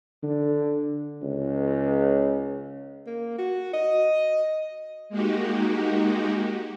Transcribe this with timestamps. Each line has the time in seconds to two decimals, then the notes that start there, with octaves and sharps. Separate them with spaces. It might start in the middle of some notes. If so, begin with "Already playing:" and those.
0.23 D3
1.22 C#2
3.07 A#3
3.39 F#4
3.74 D#5
5.09 G#3 A#3 D#4 F#4 G4